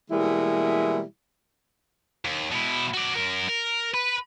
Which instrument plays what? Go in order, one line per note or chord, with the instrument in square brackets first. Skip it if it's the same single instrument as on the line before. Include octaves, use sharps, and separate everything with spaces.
[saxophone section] B2 E3 G3 G#3 A#3 E4
[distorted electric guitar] D#2
B2 E4
F#4 D5
F#2 A#4
A#4
B4